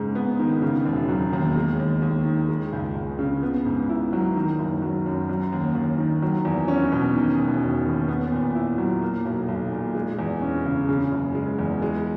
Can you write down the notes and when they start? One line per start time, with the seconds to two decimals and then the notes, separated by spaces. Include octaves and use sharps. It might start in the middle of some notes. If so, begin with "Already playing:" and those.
Already playing: G#2 C#3 G#3
0.15 B3
0.39 D#3
0.62 C#3
0.85 E1
1.09 F#3
1.33 D#2
1.56 G#3
1.79 D#2
2.02 D#2
2.26 D#3
2.49 G#3
2.73 C#2
2.95 C#2
3.19 C#3
3.43 B3
3.65 G#2
3.89 E4
4.13 F#3
4.36 D#3
4.59 F#1
4.82 F#3
5.06 F#2
5.29 F#3
5.52 D#2
5.75 D#2
5.98 D#3
6.22 F#3
6.45 E2
6.68 C#4
6.92 B2
7.15 D#3
7.39 E1
7.62 E1
7.85 D#2
8.08 B3
8.32 A#2
8.55 E4
8.78 F#3
9.02 A#3
9.25 B1
9.48 B1
9.72 A#2
9.95 G#3
10.19 E2
10.42 C#4
10.65 C#3
10.89 C#3
11.12 F#1
11.35 G#3
11.59 E2
11.82 G#3